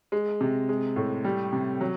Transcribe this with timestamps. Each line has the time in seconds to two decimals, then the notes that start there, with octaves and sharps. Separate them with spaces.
0.12 G#3
0.41 C3
0.69 G#3
0.96 A2
1.25 G3
1.53 C3
1.81 F#3